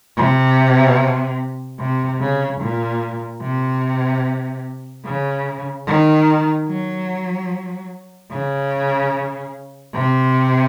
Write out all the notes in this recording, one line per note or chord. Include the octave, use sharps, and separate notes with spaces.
C3
C3
C#3
A#2
C3
C#3
D#3
F#3
C#3
C3